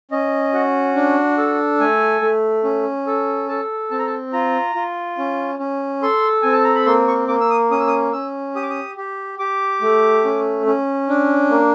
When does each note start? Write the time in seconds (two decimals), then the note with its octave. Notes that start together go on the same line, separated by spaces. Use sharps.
0.11 C#4 D#5
0.53 F#4
0.95 D4
1.38 A4
1.80 A3 G#5
2.22 A3
2.64 C#4
3.07 A4
3.49 A4 A5
3.91 C4 A5
3.99 A#5
4.07 A5
4.33 F4 A#5
4.75 F4
5.18 C#4
5.59 C#4
6.02 A4 C6
6.42 C4 G#5
6.53 A5
6.64 A#5
6.75 B5
6.86 A#3 C6
7.08 C#6
7.28 A#3 D6
7.41 E6
7.50 D#6
7.71 C#4 D#6
7.80 E6
7.87 D#6
8.13 C#4 E6
8.55 G4 D#6
8.63 D6
8.70 D#6
8.97 G4
9.39 G4 D6
9.82 A3
10.25 C#4
10.66 C#4
11.09 D4
11.50 A#3